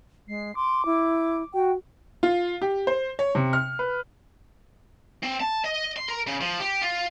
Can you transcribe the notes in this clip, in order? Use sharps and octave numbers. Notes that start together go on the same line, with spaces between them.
G#3 C7
C6 D6
E4
F#4 G5
F4
G4
C5
C#5
C3
F6
B4
C4
A5
D#5
C6
A#4
C#3
F3
G4
F4